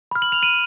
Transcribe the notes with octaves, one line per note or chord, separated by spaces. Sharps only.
B5 F6
F#7
F7
D#7 F#7